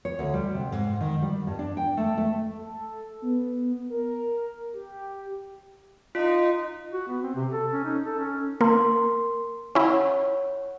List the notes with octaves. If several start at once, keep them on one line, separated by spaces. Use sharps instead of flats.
C#5
D2
G3
C3
G#2
D#3
G3
G2
D4
G5
A3
A3
A4
B3
A#4
G4
D#4 F4
F#4
B3
C4
C3
A4
C#4
D#4
A4
C#4
A#3 A#4 C6
C#4 E4 C#5 F#5